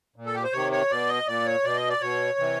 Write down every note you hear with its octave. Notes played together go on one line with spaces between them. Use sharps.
A#2
A4
G4
C5
C3 D#3 C#5
C#5
B2 D5
D#5
A#2 D5
C#5
B2 D5
D#5
D5
B2 C#5
C3 E3